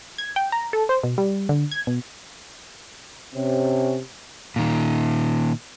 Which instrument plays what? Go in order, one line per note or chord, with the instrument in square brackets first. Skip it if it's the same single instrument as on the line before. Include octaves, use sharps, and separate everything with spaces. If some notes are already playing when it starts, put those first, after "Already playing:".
[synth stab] G#6
G5
A#5
A4
C5
B2
G3
D3
G#6
B2
[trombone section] C3 C#4
[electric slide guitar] A#2 D#3